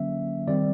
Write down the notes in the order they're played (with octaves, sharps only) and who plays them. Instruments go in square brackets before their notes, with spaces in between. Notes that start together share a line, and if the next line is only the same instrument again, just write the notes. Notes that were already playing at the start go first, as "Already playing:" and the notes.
Already playing: [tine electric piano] D3 F#3 A#3 C#4 E5
D#3 G3 C4 D5